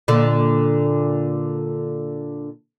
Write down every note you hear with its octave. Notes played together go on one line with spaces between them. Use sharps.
A#2 D3